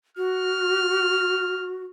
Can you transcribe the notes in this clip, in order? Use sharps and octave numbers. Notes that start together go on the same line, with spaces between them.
F#4 F6